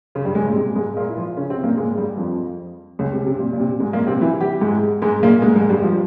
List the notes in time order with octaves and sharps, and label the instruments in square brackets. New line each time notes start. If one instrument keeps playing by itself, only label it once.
[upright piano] C#3 C#4
G2 G3
G#2 G#3
A#2
C3
G#2 G#3
A#2 A#3
E4
F3 F4
C#3 C#4
C3 C4
A#2 A#3
G#2 G#3
G2 G3
F2 F3
C#2 C#3
C3
C3
A#2
A#2
C3
G#2 G#3
A#2 A#3
C3 C4
E3 E4
G3 G4
G#2 G#3
G#2 G#3
A#2 A#3
G#2 G#3
G#2 G#3
G2 G3
F3